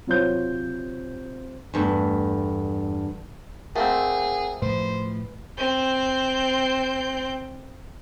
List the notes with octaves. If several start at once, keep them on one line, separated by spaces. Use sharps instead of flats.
C3 F#3 F4 C5 C#5 G6
E2 G2 A3
A3 A#3 C4 G#4 A#4 F#5
A2 F3 B4 C5
C4 G6